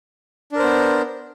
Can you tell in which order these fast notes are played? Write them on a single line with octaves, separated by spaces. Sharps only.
D4 A#4 C5 B3